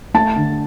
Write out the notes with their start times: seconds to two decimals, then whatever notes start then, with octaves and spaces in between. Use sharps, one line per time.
0.14 A3 A5
0.36 D3